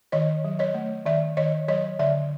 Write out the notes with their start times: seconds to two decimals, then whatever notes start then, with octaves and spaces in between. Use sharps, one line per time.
0.12 D#3 C#5 D#5
0.44 F#3
0.59 C#5 D#5
0.74 A3
1.06 D#3 D5 E5
1.37 D#3 C#5 D#5
1.68 F#3 C#5 D#5
1.99 D3 D5 E5